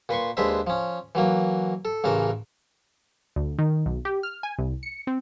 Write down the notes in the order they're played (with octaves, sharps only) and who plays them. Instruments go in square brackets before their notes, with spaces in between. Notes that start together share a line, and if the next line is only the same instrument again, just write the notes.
[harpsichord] A#2 B4 C6 C#6
D#2 G#3 D4 B4 C5 E5
F3 C#4
E3 F#3 A#3
A4
A1 C#3 E3 A#4 A5
[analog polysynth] D2
D#3
B1
G4
F6
G#5
C2
C#7
C4